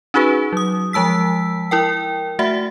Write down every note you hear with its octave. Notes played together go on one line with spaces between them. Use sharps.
C#4 D#4 F#4 G#4 B4
F#3 D#6
F3 G#3 A5 E6 B6
E4 A#4 G5
A3 F#4 E5 F#5